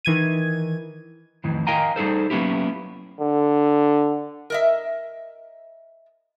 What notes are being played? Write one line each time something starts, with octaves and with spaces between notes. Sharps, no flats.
D#3 E3 G#6 D#7
F2 A2 D#3 E3
A#4 D#5 F5 G5 G#5 A#5
G3 D#4 G#4 A4 C5
F#3 A#3 B3 C#4 E4 G4
D3
A#4 D#5 E5